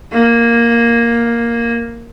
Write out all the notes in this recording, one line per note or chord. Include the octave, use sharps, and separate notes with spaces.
A#3